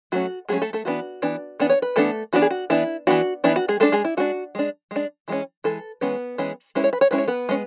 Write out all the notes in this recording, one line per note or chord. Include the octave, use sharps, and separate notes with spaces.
F#3 A3 C#4 F#4
F#3 G#3 A3 C#4 G#4
A3 A4
A3 A4
E3 B3 D4 F#4
E3 B3 D4
E3 B3 D4
C#5
B4
E3 A3 B3 D4 A4
E3 B3 D4 F#4
G#4
F#4
E3 B3 D4 E4
E3 B3 D4 F#4
E3 B3 D4 E4
F#4
G#3 G#4
G#3 A3 D4 A4
G#3 G#4
E4
G#3 D4 F#4
G#3 D4
G#3 D4
E3 G#3 C#4
E3 G#3 A4
E3 G#3 B3 C#4 B4
E3 G#3 C#4
G#3 C#4 E4 B4
C#5
B4
C#5
G#3 C#4 E4 B4
C#5
B3 B4
G#3 C#4